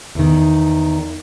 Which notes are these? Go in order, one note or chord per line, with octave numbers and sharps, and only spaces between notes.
E2 D#3